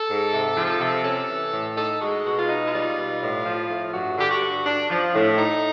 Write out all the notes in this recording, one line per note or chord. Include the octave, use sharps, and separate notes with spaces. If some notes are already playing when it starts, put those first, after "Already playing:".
Already playing: A4
G#2
C3
F3
C3
C#4 A4
E3
A2
D#4 A4
G#3 F#4
B2 F#4
F4
D#4
F4
G3
B2
A2
F3
A2
G2 F#4
D3 G4
F#4
G2
D4
F3
A2
D#4